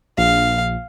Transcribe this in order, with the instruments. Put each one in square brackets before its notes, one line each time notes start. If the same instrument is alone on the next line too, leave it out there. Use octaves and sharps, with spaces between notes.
[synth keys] A#1 [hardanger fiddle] F5